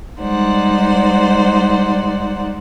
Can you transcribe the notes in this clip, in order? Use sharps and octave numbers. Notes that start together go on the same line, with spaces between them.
G3 G#3 D#4 C5 D5 F#5